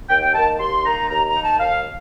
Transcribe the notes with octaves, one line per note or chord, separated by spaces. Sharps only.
D#2 G5
G5
D#3 A#3 D#4 A5
D#2 C6
D#3 A#3 D#4 A#5
D#2 A#5
A#5
D#3 A#3 D#4
A5
D#2 F5